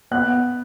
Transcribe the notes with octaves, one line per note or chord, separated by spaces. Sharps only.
B3 F#6